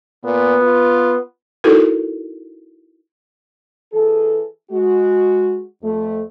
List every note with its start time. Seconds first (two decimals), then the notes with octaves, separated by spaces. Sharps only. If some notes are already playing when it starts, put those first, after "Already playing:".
0.25 A#2 B3
0.62 F4
1.64 D#4 E4 F#4 A4 A#4
3.92 E3 G#4 A4
4.71 G#3 F#4
5.82 F2 A3